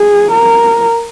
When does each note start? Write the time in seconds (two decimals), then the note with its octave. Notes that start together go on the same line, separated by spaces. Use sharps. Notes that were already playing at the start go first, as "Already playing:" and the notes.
Already playing: G#4
0.32 A#4